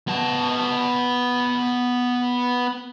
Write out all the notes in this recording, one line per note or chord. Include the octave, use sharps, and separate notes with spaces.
B3 A5